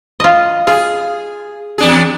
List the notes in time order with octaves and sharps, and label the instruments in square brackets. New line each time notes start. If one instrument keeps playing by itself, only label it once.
[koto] F4 D#5
[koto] F4 [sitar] G#4
[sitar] E2 D4 G#4